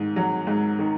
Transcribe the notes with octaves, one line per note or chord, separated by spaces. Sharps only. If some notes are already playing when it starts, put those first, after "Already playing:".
Already playing: G#2 D#3
F#3
G#2
D#3